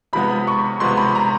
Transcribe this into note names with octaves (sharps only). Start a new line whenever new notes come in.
C3 F3 G#3 B3 B5
C#6
C3 F3 G#3 B3 C6
B5
A#5